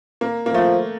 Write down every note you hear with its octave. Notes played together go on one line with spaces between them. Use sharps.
A#3
A#3
F3 A3